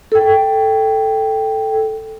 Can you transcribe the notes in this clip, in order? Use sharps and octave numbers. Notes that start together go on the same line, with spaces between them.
A4 G5